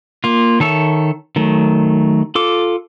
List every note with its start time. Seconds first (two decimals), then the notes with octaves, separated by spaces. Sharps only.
0.24 A#3 F4
0.60 D#3 A4 C#5 E5
1.36 D#3 F#3 A3
2.35 F4 A4 D6